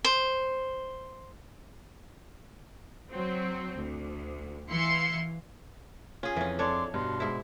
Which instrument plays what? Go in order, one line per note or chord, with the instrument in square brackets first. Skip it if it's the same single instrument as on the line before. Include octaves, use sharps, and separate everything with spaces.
[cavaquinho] C5
[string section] F#3 C4
D2
E3 E4 F5 C6 C#7
[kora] C#4 G#4 [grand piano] F4 [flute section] G#5
[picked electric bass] F2 [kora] E3 C#4
[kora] D4 C#5 [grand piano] A4 D5 [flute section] C6 D6
[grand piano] G2 [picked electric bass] B2 [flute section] C6
[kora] G#2 E4